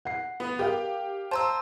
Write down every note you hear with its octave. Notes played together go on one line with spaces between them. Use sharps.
F#5 C7
B3
G4 A#4 F5
C5 A5 A#5 E6